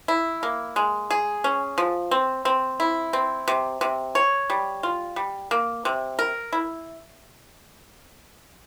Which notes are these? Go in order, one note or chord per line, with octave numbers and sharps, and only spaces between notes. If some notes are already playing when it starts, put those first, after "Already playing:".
E4
A#3
G#3
G#4
C#4
F3
C4
C4
E4
C4
C3
C3
C#5
G3
F4
G3
A#3
C3
A#4
E4